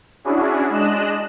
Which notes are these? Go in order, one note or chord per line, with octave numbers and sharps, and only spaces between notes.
C#4 D4 E4 F#4 G#4
G#3 D4 D#5 F#6 E7